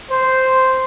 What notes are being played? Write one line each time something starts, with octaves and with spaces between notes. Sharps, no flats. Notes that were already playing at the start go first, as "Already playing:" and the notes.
C5